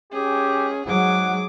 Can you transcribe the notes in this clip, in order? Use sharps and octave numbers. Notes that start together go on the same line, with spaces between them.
C#4 G4 G#4
G#2 F#3 G#4 F#5 D6